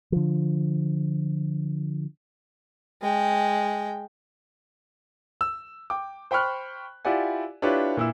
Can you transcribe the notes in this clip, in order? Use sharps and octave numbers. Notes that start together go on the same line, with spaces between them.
D3 F3
G#3 G5
E6
G5 D6
C5 G5 B5 C#6 F6 F#6
E4 F4 G4 D5 F#5 G#5
D4 E4 F4 G4 B4 C#5
A#2 E4 E6